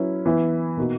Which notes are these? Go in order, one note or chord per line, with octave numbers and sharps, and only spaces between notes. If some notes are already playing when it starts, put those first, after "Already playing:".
Already playing: F#3 C#4 E4 B4
E3 B3 E4
B2 A#3 D#4 F#4